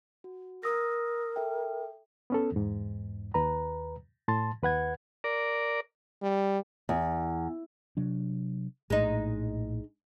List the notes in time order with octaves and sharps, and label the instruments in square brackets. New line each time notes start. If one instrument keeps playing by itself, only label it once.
[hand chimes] F#4
[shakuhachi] A#4 [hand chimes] D#6 E6 A#6
[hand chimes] A4 E5 G5
[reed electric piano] B3 C#4 A4
E2 G#2
D#2 B4 A#5
A2 A5 C6 A6
D#2 B4 F#5 G#6
[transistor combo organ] A#4 D5
[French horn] G3
[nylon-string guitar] E2
[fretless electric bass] C3 F#3 D4
[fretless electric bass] A#1 A2 [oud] G#3 D#4